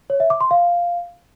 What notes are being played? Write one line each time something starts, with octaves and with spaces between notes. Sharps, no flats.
C#5
E5
D6
C6
F5